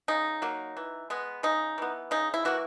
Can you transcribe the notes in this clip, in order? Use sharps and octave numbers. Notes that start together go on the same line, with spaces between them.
C#3 D#4
F#3 A#3
E3
G#3 B3
C#3 D#4
E3 B3
C#3 D#4
E4
E3 A#3 F#4